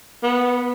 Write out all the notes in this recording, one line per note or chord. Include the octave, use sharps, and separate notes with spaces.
B3